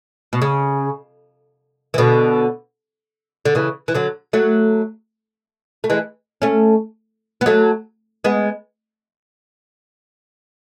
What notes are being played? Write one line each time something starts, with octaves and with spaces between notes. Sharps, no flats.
B2
C#3
E3
B2 D3
D3
C#3 E3
E3
D3 F#3
F#3 A3
A3
E3 G#3
A3 C#4
B3
F#3 A3
G#3 B3